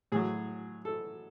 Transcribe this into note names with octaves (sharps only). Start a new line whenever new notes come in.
A2 F#3 G#4
A4